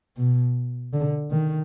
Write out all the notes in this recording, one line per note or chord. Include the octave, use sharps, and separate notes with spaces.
B2
D3
D#3